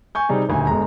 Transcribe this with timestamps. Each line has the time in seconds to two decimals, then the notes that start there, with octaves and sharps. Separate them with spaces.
0.15 G#5 C#6 G6
0.29 C3 G3 D#4 G#4
0.49 D#1 D2 G#5
0.67 G1 G#3 A#5